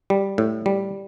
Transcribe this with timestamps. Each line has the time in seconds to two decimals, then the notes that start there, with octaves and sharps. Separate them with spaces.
0.10 G3
0.38 A2
0.66 G3